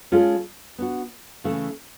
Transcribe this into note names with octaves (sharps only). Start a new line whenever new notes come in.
G#3 C#4 F4 A4
B3 D4 F#4
C#3 E3 A3